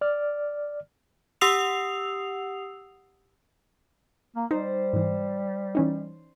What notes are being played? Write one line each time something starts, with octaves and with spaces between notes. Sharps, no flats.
D5 F6
G4 F#5 D#6 E6 C7 F7
A#3
G3 D#4 C5 D5
G#2 E3
E3 C#4 D#4